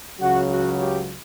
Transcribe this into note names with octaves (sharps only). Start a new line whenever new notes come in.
C#2 C#3 F#3 F#4
F#4
G4